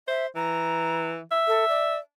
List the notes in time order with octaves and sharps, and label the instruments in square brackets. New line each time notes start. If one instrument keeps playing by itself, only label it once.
[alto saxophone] C5 [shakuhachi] E5
[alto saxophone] E3 [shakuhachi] A#5
[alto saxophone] E5
[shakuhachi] A4
D5